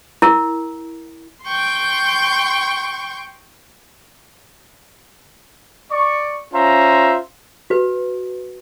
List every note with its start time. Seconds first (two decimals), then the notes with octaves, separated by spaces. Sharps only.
0.22 E4 A#4
1.47 G5 C6 C#6 G6
5.90 D5 C#6
6.53 C#4 F4 C5 E5 A#5
7.70 F#4 B4